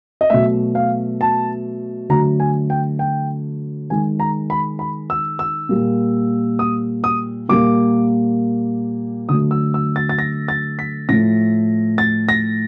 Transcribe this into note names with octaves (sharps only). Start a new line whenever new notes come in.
D#5
B2 F#3 A3 E5
F5
A5
D3 F#3 A3 A#5
G#5
G5
G5
D#3 G#3 G#5
A#5
B5
B5
E6
E6
A#2 G3 A#3
D#6
D#6
A#2 G3 A#3 D6
D3 F#3 A3 D#6
E6
E6
A6
A6
A#6
A6
B6
A2 F3 A3 A#6
A6
A#6